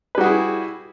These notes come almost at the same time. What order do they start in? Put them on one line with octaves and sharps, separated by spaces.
B4 G3 F#4 G#4 E4